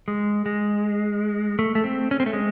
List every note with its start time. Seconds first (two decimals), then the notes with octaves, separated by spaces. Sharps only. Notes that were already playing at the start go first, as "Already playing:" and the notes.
0.08 G#3
0.46 G#3
1.59 A3
1.75 A3
1.84 C4
2.11 C#4
2.20 C4
2.26 A3
2.33 G#3